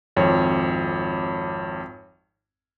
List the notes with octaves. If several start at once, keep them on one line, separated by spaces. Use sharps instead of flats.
G#1 F2 C#5